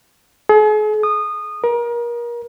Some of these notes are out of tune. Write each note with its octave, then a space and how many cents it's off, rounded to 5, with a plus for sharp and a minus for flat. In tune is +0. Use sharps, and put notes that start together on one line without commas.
G#4 +45
D#6 -20
A#4 +30